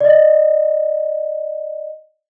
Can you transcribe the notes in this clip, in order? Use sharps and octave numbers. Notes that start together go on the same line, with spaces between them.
D5 D#5